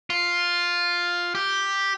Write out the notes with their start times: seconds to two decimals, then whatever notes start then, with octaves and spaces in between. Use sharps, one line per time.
0.10 F4
1.35 G4